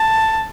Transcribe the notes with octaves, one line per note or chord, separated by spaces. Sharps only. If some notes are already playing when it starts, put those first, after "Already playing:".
Already playing: A5